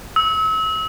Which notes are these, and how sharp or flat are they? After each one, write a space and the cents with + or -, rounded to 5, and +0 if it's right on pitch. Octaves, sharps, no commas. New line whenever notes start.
E6 -35